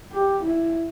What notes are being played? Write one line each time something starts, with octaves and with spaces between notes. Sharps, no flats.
G4
E4